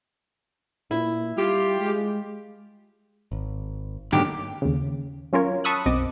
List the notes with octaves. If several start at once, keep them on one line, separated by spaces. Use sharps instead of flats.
A#2 E4
G3 F4 G4
G#3
G#1
B1 G#2 D3 D#3 A#3 D4 G4
D#2 C#3
F#3 C#4 F4 A#4 C#5
A5 B5 C#6 D#6 E6 F#6
B1 F#2 C4 D#5 D6